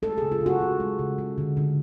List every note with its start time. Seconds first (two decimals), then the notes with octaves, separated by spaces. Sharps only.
0.02 G#3 A4
0.18 C#3 G#4
0.32 F4
0.41 C#3
0.46 F#4
0.60 G#3
0.80 G#3
0.99 C#3
1.18 G#3
1.38 D3
1.57 D3